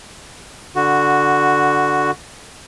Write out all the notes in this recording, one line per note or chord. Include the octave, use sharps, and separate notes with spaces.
D3 F#4